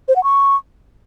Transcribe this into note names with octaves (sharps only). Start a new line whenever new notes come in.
C5
F#5
C#6